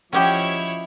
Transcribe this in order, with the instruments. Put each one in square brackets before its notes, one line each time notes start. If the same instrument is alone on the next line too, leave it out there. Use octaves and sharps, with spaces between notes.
[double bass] F3 [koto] C#4 G4 [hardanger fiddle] E4 C#5 [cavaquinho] F#4 D#5 G5